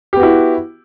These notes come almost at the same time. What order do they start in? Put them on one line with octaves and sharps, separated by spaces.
G4 B3 F#4 E4